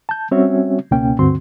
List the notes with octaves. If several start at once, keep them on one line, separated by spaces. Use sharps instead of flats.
A5 G6
G3 C4 C#4 F#4 C#5 E5
C#2 B2 A#3 C#4 G5
D2 G2 D3 C4 F#4 C6